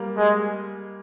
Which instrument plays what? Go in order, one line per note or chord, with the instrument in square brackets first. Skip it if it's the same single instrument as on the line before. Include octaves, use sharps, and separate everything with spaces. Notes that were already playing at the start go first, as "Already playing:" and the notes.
Already playing: [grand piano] G3 A#3
[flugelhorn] G#3